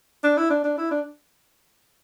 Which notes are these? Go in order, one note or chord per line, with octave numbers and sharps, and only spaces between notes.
D4
E4
D4
D4
E4
D4